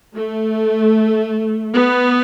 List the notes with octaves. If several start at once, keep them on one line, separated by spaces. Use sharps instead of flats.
A3
B3